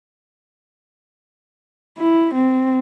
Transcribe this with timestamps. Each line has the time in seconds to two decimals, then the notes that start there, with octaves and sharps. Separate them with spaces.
1.98 E4
2.35 C4